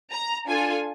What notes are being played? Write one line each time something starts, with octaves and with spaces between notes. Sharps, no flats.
A#5
D4 F4 A4 G#5